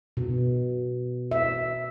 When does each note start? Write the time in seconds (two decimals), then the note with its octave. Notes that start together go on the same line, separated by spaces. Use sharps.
0.17 B2
1.31 E5